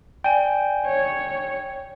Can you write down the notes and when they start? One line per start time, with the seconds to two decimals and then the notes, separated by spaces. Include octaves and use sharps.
0.24 D5 G5 G#5
0.86 C#5